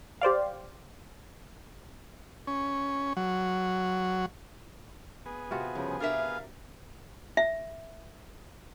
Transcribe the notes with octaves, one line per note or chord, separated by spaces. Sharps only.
G4 C5 D5 F5
C#4
F#3
B3 G#4
C3 F4 F#4
G2 C#3 F3
D4 A#4 E5 F5
E5